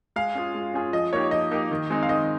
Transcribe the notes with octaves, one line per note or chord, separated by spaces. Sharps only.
G#3 F5
C#4 F4 G#4
G#3
C#4 F4 G#4
F3 D#5
A#3 D#4 G4 C#5
F3 D#5
A#3 D#4 G4
D#3
G#3 C4 D#4
F5
D#3 D#5